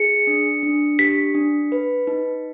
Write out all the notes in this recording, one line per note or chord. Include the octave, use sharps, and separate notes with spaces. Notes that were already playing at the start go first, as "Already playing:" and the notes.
Already playing: G#4 C#7
D4
D4
G4 B6
D4
B4
D#4